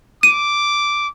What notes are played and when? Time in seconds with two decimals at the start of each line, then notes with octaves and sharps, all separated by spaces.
0.23 D6 D#7